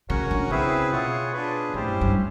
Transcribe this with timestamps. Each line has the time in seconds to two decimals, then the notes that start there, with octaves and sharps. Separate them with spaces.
0.09 C#3 C#4 F#4 A#4 C#5 F#5
0.31 D3
0.50 C#3 C4 E4 G#4 B4 E5
0.92 B2 F4 G#4 C#5 F#5
1.33 D4 F4 G#4 B4
1.73 A2 C#4 E4 G4 C5
1.87 G2
2.01 G2